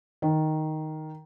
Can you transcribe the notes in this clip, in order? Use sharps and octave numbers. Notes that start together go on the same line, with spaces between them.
D#3